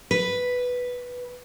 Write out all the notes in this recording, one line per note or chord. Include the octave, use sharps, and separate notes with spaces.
B4